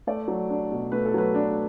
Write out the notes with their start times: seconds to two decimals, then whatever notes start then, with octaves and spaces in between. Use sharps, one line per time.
0.07 A3 D5
0.28 F#3
0.50 D4
0.72 B2
0.92 A3 B4
1.06 A4
1.14 F#3 B4
1.35 D4